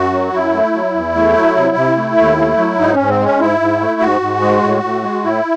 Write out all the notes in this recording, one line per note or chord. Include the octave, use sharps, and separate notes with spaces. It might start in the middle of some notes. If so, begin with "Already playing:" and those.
Already playing: F#2 F#4
F#3
F#2 E4
A3
F#3
E2
A3
F#3
C3
C3
A3
D#2
A3
F#3
G#2 D#4
C#4
G#2
C4
G#3 C#4
G#2 E4
G#2
A3
G#2 F#4
G#2
G#3
A2
A2
G#3
A2 E4